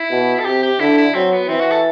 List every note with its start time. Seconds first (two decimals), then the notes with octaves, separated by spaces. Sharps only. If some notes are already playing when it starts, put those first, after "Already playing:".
Already playing: E4
0.11 B2
0.40 A4
0.45 C3 G4
0.63 G4
0.80 D3 E4
0.97 E4
1.14 F#3 C4
1.32 B3
1.48 E3 C4
1.60 F#4
1.71 A4